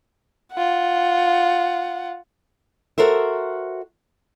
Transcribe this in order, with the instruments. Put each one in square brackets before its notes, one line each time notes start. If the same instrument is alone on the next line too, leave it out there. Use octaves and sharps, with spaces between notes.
[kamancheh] F4 F#5
[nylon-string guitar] F#4 A4 A#4 C5 E5